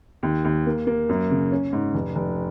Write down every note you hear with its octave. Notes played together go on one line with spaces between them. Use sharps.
D#2
D#2
A#3
A#3
F#2
C#3
C#4
G#2
F1
F1